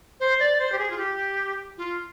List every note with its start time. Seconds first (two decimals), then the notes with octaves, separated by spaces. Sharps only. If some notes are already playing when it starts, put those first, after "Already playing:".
0.20 C5
0.39 D5
0.58 C5
0.72 G4
0.78 G#4
0.90 F4
0.97 G4
1.77 F4